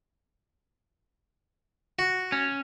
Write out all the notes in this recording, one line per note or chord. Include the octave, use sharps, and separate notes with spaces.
F#4
C#4